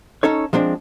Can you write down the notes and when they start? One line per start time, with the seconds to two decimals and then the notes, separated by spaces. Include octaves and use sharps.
0.23 C#4 D#4 A4 C#5
0.53 F3 G#3 C4 D4